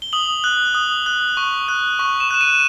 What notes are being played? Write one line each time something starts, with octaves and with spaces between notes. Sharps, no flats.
G7
D#6 F#7
F#6
D#6
F#6
C#6
F#6
C#6
E7
F#6 E7
D#7